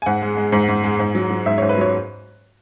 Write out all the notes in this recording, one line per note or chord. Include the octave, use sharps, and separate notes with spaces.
G#5
G#2 F#5
G#3
G#3
G#2
G#2
G#3
G#2
F#3
F#3
G#2 E5
C#5
G#2
B4
F#3 C#5